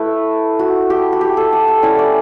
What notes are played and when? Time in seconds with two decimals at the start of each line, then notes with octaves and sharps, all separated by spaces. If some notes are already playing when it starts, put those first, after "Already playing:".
Already playing: A3 E4 B4
0.59 F#4
0.90 G4
1.12 F#4
1.21 G4
1.37 A4
1.53 F#5
1.68 G5
1.83 G3 C#4 E4 F#5
1.99 D5